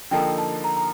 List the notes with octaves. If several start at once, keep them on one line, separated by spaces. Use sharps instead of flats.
D3 F3 A#3 D#4 A4 G5
A5
A#5
A#5